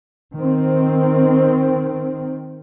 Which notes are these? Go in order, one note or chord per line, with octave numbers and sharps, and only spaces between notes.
D#3 C4